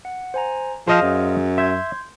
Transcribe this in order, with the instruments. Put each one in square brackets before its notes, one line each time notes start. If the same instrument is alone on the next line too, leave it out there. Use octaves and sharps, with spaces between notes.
[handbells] F#5
C5 G#5 A#5
[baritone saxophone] F3 [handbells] G#4 [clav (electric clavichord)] C5 D#5 F5
[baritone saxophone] F#2
[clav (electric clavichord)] E5 [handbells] C6 G6 G#6